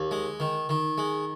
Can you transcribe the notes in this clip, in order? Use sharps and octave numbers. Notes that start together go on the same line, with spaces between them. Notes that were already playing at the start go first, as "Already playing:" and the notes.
Already playing: D#2
G#3
D#3
D#3
G#3